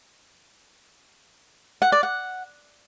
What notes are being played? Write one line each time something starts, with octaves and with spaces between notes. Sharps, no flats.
F#5
D5
F#5